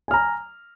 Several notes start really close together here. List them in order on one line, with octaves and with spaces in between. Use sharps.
G#5 F6 A#5